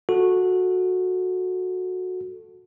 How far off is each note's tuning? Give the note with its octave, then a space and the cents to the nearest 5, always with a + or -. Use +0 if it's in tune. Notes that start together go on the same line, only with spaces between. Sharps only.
F#4 -15 A4 +0